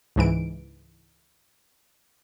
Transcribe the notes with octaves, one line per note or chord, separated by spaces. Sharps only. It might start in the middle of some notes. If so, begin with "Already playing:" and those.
C#2 G#2 E3 D7